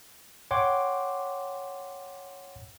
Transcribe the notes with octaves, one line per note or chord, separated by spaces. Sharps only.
C#5 F#5 G5 C6 D6